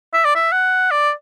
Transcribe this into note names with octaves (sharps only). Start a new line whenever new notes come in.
E5
D5
E5
F#5
D5